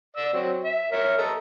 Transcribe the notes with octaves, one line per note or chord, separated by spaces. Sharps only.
D5 E6
F#3 C4
E5
A#4 C#5 E5
A4 D#5 A#5